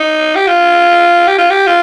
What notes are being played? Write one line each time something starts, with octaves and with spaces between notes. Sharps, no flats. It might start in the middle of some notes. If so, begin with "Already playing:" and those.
Already playing: D#4
G4
F4
G4
F4
G4
F4